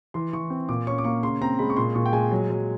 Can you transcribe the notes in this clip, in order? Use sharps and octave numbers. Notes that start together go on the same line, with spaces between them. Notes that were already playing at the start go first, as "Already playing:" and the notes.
E3 C6
E3 C#6
C4
A#2 D6
C#4 C#6
D6
A#3 C#6
C#3 C6
C4 A#5
G#3 B5
C#6
A#2 C6
A#2 C#6
G5
G#3 G#5
F#3
F#3